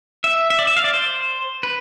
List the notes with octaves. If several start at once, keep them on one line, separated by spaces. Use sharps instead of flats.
E5
E5
D5
E5
F5
D5
C5
B4